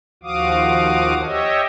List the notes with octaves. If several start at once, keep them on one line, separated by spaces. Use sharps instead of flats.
D#2 F3 F#4 F5 D6 D#6
G4 C#5 D#5 E5